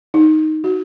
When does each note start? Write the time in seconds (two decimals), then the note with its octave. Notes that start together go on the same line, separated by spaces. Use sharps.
0.14 D#4
0.64 F#4